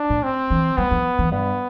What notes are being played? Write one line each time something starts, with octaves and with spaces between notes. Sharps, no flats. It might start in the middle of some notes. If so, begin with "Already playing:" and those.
Already playing: D4
A2
C4
E3
G3 B3
F3
E3
G2 B3